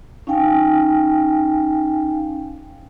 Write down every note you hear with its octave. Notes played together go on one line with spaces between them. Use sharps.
C#4 D#4 F5 G5 G#5